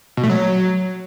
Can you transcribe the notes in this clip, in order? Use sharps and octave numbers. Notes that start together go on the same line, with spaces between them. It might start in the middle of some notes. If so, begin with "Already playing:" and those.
B2
A3
F#3